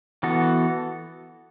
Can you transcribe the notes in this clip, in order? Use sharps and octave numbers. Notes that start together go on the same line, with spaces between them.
E3 B3 F#4 A4